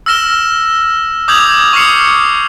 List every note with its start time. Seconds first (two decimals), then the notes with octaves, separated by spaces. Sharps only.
0.06 E6 F6 A#6 E7 G7
1.28 D6 D#6 G6 G#6 F7 F#7
1.73 C#6 D#6 F6 C7 C#7